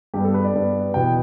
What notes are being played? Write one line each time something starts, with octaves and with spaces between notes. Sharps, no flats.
G2 G3 B3 G4
A4
B4
D5
G2 G3 B3
E2 B2 B3 G5